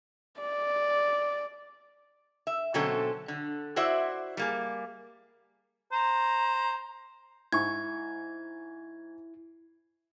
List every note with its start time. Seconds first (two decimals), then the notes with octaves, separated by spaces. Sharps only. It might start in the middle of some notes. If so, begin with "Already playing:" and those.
0.40 D5
2.47 E5
2.74 B2 D3 F#3 C4 C#4 A4
3.28 D3
3.76 E4 F#4 C5 D5 E5
4.37 G3 A#3 G#4
5.92 C5 A#5
7.52 G#2 E4 C#6 G#6